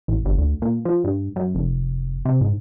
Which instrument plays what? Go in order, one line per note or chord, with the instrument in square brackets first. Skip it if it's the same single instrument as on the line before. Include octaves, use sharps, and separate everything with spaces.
[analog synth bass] A1
G1
D2
A#2
F3
G2
F#2
F1
C3
G#2